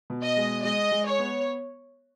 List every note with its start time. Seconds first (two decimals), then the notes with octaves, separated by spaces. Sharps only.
0.10 B2
0.23 D#5
0.37 G#3
0.64 G#3 D#5
0.91 G#3
1.06 C#5
1.19 B3